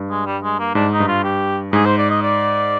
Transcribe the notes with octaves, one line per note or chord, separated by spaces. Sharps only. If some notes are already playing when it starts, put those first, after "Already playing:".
Already playing: G2
G#3
G3
G#3
A#3
G#2 D4
D#4
G2
F4
G4
G#2 G#4
C5
D5
D#5
D5